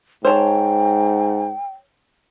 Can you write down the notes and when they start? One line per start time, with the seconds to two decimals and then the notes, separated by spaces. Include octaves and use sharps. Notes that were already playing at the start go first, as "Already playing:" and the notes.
0.25 G#2 C5 C#5 G5 A5